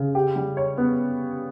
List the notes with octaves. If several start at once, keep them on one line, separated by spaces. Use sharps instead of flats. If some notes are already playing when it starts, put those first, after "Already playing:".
Already playing: C#3
G4
G3
C#5
B3